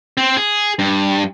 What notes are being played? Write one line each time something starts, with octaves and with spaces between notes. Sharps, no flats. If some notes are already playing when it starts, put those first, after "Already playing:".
C4
G#4
G2